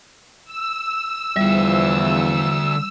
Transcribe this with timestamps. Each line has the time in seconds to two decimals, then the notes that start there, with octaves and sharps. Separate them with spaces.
0.45 E6
1.36 E2 D3 F3 G3 E5